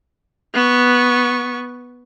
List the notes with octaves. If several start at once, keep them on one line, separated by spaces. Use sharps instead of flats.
B3 C#6